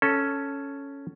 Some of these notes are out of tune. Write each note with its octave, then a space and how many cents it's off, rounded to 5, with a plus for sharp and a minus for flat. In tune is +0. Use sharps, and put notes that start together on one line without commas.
C#4 +0 A4 +0